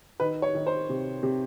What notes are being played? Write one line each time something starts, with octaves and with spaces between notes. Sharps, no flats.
D#3 B4
C#5
D#3
C5
C3
C3